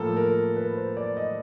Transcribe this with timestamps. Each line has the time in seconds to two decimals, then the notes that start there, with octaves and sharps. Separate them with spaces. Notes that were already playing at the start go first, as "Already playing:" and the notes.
Already playing: A2 F3 A#3 A4
0.17 A#4
0.56 B4
0.77 C5
0.97 D5
1.17 D#5